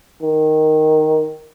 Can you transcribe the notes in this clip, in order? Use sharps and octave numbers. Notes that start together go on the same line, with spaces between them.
D#3